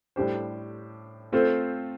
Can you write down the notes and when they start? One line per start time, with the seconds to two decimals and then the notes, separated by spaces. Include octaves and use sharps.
0.16 A2 G3 D4 G4 C5
1.32 A3 C4 F4 A4 C5